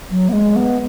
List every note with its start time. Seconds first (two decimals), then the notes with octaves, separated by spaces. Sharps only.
0.11 F#3
0.29 B3
0.33 G#3
0.56 B3